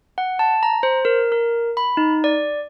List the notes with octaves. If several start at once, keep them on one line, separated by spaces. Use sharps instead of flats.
F#5
A5
A#5
C5
A#4
A#4
B5
D#4
D5